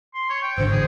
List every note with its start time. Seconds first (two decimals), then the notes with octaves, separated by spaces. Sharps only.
0.14 C6
0.29 C#5
0.42 G5
0.58 G#1 D3 C5
0.72 A1 G#4